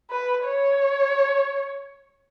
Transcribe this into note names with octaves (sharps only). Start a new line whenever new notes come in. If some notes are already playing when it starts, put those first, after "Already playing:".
B4
C#5